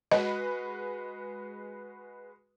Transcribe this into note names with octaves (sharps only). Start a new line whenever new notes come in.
G#3 F#4 B4 D#5